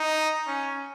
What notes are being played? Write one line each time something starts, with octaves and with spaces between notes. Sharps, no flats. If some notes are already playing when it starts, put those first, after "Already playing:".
Already playing: D#4
C#4